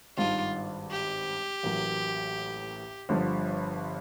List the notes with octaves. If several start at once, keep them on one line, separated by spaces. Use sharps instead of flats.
G#1 G2 D#3 F4
G4
A1 A2 F#3 A#3
G1 G2 D3 F3